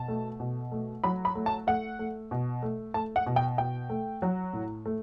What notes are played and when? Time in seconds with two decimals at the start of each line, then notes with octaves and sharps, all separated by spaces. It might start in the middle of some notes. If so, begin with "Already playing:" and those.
Already playing: B2 A5
0.08 A3
0.40 B2
0.72 A3
1.04 F#3 B5
1.25 B5
1.35 A3
1.46 A5
1.67 A3 F#5
1.99 A3
2.31 B2
2.63 A3
2.94 A3 A5
3.16 F#5
3.26 B2
3.36 G5
3.58 B2 G5
3.90 A3
4.22 F#3
4.53 A2
4.86 A3